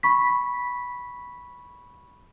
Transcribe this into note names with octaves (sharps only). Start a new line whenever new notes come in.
B5 C#6 B6